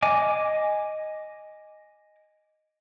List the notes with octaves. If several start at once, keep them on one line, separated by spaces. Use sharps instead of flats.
D#5 G#5 D6